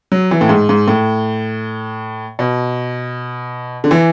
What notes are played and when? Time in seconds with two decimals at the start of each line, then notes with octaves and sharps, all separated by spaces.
0.12 F#3
0.31 E3
0.41 A2
0.49 G#2
0.69 G#2
0.88 A2
2.39 B2
3.84 D3
3.91 E3